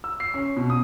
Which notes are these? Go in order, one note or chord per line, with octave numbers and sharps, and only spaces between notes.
E6
C7
C#4
B2
D#6